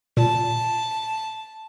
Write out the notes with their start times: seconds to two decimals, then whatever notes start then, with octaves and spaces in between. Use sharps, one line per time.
0.17 A#2 A5